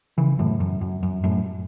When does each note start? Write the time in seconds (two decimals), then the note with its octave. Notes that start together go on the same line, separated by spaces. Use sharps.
0.18 C#3 E3
0.39 F#2 A2
0.60 F#2
0.81 F#2
1.03 F#2
1.24 F#2 A2